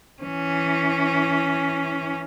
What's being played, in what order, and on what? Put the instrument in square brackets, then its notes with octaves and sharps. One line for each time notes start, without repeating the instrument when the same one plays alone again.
[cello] E3 C#4